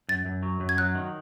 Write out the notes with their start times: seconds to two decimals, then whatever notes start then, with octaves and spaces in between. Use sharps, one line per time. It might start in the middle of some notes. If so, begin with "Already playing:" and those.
0.09 F#2 A6
0.26 F#2
0.43 F#3
0.60 F#2
0.69 G#6
0.77 F#3 F#6
0.95 D#3